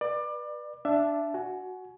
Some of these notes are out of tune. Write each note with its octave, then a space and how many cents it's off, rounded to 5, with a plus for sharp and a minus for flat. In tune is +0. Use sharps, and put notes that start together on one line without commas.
B4 -20 D5 +25
D4 +0 E5 +20 A5 -10
F#4 +0 G#5 +30